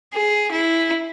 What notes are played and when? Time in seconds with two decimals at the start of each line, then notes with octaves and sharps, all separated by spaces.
0.14 G#4
0.51 E4